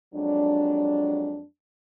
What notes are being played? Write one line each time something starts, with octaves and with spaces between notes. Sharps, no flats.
F2 F#3 G#3 D4